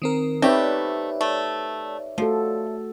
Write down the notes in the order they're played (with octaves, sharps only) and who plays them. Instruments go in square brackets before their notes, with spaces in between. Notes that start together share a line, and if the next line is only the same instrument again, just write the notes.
[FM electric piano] D#3 C4 A#4
[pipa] A3 [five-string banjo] C4 G4 [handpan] D#4 B4 [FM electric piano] C#5 D5 E5
[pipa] A3
[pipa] F3 [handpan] A3 F#4 A4